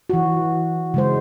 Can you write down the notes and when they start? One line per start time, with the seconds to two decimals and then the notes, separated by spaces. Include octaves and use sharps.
0.10 E3 F#4
0.94 C#3 G#3 C5